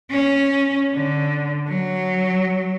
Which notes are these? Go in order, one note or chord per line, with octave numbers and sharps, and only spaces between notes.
C#4
D3
F#3